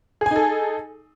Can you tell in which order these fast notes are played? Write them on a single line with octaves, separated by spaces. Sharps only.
G#4 G#5 D#4 A4